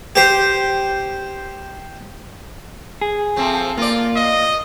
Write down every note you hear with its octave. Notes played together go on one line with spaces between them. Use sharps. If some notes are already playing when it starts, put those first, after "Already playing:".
G4 C5
G#4
F3 A3 C4
A#3 F4 D5
D#5